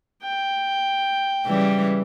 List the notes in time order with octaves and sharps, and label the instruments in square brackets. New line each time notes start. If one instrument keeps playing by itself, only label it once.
[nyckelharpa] G5
[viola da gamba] C#3 E3 G3